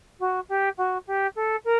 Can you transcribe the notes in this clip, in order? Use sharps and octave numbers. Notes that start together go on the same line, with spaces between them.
F#4
G4
F#4
G4
A4
A#4